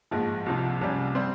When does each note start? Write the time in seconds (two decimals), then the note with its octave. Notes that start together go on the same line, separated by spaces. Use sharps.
0.11 A#1 G#2 F3
0.46 C2 C3 F3
0.81 C2 C3 G3 C#4
1.15 G3 C4